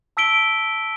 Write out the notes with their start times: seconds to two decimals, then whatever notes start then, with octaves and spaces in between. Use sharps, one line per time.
0.17 A5 E6 B6 D7 G7